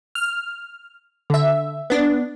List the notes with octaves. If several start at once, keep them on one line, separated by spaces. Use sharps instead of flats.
F6
D3 E5
B3 D4